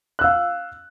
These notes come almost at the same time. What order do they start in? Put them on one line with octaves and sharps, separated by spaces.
F#6 E6 F5